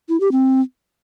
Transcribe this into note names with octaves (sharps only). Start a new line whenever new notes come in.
E4
G4
C4